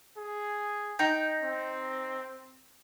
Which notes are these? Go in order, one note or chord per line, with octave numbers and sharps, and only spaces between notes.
G#4
D#4 G5
C4